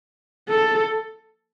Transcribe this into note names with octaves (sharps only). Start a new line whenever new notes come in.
A4